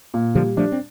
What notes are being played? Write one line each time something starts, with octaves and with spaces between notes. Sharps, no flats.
A#2
D3 F3 G3
F3 A3 D4
C4